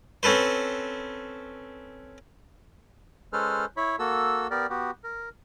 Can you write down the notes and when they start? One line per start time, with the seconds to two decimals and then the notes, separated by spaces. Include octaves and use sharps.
0.23 C4 C#4 A4 B4 C5
3.33 G#3 C#4 A4 B4 C5 F6
3.77 E4 C#5 B5
3.99 A#3 F#4 A4 E6
4.51 B3 G4 A#4 D5
4.70 B3 F#4 G4
5.04 A#4